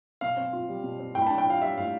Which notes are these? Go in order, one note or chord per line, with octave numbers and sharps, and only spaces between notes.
B2 F5
C4
F4
G3
B2
C4
A2 G5
B5
D4 A5
G5
F4 F5
G3 E5
A2 F5